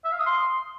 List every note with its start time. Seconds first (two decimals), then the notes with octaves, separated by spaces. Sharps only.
0.05 E5
0.12 F5
0.19 D#6
0.26 C6